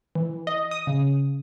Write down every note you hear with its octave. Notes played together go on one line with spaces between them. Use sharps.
E3
D#5
D#6
C#3